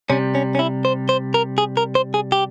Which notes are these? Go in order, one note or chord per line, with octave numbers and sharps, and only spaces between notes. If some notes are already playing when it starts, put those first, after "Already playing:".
C3 G3 C#4
C#4
C#4
E4
C5
C5
A#4
G#4
A#4
C5
G#4
G4